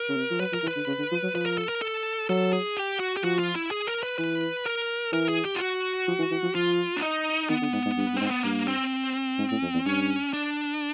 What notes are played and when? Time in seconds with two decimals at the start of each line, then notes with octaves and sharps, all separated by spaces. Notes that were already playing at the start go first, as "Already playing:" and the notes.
Already playing: A#4
0.09 C#3
0.17 C3
0.31 F3
0.40 F#3 B4
0.52 F3 A#4
0.63 E3
0.68 B4
0.76 D3
0.87 C#3
0.99 D3
1.12 F3
1.23 F#3
1.34 F3 B4
1.46 A#4
1.58 A4
1.69 A#4
1.82 A4
2.29 F#3 A4
2.53 G#4
2.77 G4
3.00 F#4
3.17 G4
3.24 F3 F#4
3.39 F4
3.55 E4
3.71 G#4
3.87 A#4
4.03 B4
4.18 E3 B4
4.66 A#4
5.12 E3 A#4
5.29 G#4
5.45 G4
5.55 F4
5.60 F#4
6.08 F3
6.19 E3
6.31 E3
6.43 F3
6.54 F3 F4
6.97 D4
7.02 D#4
7.49 D#3 B3
7.62 D3
7.73 G#2
7.85 G#2
7.97 G2
8.13 G2
8.17 G#2 C4
8.31 B3
8.44 G2 A#3
8.68 C4
9.39 G#2
9.51 A2
9.62 F2
9.74 E2
9.85 G2 C#4
10.33 D4